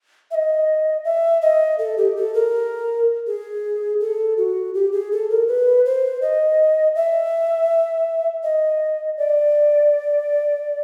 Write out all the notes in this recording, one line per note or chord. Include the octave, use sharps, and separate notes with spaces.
E5
D#5
E5
D#5
A4
G4
A4
A#4
G#4
A4
F#4
G4
G#4
A4
A#4
B4
C5
D#5
E5
D#5
D5